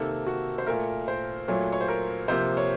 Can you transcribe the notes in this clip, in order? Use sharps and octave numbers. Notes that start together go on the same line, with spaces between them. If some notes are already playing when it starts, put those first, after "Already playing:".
Already playing: C3 D#3 A#3 A4
F#4
C5
A#2 A3 A#4
C5
A#2 F#3 A3 C#5
C#5
C5
A#4
C3 F3 A#3 C5
C#5